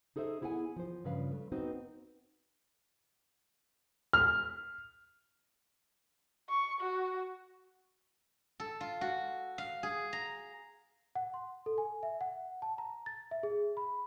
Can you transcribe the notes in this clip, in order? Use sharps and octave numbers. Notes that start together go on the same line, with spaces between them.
D#4 G#4 A4 C5 E5
B3 E4 G#4 F5 F#5 G#5
F3 C5
G2 C#3 F3 B4 F5
A3
B3 C4 D#4 F#4 B4 C5
F6
C#6
F#4
A4
F4
F#4
F5
G#4
A#5
F#5
C6
A4
G#5
E5
F#5
A5
A#5
A6
E5
G#4
B5